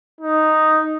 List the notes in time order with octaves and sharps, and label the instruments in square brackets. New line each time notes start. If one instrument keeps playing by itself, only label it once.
[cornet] D#4